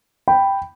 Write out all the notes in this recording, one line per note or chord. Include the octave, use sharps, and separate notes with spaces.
G5 B5